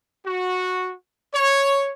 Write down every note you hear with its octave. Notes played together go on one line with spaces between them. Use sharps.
F#4
C#5